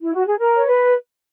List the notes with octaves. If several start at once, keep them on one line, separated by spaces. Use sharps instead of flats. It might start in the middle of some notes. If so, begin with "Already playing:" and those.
E4
F#4
G#4
A#4
C#5
B4